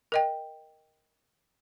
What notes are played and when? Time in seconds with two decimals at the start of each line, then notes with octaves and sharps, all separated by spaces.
0.12 A#4 D#5 G5